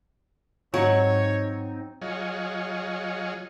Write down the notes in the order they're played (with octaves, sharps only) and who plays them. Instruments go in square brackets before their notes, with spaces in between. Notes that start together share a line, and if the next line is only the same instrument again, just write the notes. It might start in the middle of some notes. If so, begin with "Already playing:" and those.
[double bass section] G#2 [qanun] F#3 [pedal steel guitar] C4 D#4 [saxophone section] C#5
[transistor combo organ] F#3 F4 G#4 C#5 D#5